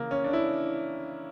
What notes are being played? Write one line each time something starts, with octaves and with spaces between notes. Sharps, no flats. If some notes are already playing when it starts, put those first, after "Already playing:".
Already playing: C#3 E3 A#3
C#4
D4
E4